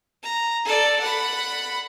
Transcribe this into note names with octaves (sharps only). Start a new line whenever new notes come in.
A#5
A4 D5
F#5 B5